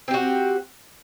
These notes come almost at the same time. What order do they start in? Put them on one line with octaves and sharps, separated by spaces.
C4 G4 F#4